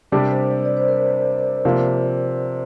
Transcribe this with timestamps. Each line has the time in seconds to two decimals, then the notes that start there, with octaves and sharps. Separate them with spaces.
0.12 C3 G3 D4 G4 A#4
0.32 C5
0.50 D5
0.65 D5
0.77 C5
0.88 A#4
1.65 C3 F3 A#3